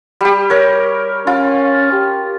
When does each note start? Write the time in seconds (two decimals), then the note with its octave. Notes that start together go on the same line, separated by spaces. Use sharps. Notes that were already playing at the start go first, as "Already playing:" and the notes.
0.21 G3 G4
0.50 A#4 C#5
1.27 C#4 F4
1.93 G4